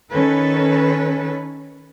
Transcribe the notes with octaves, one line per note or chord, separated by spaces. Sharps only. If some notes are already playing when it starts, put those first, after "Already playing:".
D#3 C#4 A4 B4